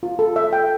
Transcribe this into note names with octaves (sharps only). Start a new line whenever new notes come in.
F4
A4
E5
G5